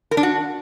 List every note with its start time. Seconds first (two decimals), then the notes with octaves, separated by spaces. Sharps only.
0.11 A#4
0.17 D4
0.23 F#4